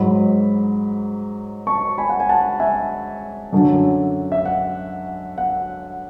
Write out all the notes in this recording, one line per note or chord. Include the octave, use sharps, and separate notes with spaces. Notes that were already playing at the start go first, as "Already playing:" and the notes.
Already playing: G#2 F#3 B5
A5 C#6
G#5 B5
F#5
G#5
F#5 A5
E5 G#5
F#2 D3 F#3
E5
F#5
F#5